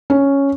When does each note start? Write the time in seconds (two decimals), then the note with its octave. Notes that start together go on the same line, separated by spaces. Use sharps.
0.10 C#4